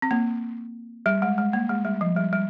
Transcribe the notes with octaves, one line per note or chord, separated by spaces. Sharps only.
C4
A#3
G3
G#3
G#3
A#3
G#3
G3
F3
G3
G3